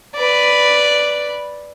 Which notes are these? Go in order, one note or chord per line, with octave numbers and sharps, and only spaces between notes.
B4 D5